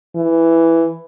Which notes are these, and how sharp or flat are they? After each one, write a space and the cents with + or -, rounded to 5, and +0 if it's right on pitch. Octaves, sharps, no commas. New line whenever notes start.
E3 +5